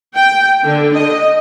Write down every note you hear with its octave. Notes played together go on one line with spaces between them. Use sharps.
G5
D3
D#5